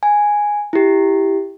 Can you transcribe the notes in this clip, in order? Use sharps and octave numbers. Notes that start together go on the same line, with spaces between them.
G#5
E4 G4